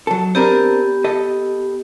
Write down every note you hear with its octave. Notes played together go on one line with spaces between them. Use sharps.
F#3 A4
B3 C4 D4 G4 A#4
A4 D#5